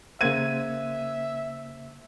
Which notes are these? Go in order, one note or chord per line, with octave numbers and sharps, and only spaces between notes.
C#3 A#3 C5 E5 G#6 D#7